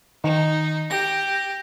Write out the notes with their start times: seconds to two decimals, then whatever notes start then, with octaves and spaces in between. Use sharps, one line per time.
0.24 D#3 D#4
0.91 G4 A#6